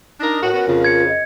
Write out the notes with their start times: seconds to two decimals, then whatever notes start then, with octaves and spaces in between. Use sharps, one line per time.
0.20 D4 D#4 A#4 D#5
0.42 A2 F#4 A#4
0.54 B3 C#4 F#4
0.67 F2 C#3 F4
0.84 G#6 C#7
1.08 D#5